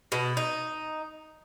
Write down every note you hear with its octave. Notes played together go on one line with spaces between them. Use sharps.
B2
D#4